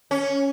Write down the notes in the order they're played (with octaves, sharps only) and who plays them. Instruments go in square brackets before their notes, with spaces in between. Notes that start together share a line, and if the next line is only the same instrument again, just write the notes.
[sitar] C#4